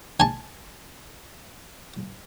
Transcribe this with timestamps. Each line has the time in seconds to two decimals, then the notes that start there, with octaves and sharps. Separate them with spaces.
0.20 G#5 A5